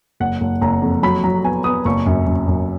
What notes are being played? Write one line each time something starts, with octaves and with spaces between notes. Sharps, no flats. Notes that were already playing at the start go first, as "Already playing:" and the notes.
F#1 F#5
F#1
F#1 A#5
F2
F#3 B5
F#3 A#5
B3 G#5
B3 D#6
F#1 C#6
F#2
F#2
F#2